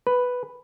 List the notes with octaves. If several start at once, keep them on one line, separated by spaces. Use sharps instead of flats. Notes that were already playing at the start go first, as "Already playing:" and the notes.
B4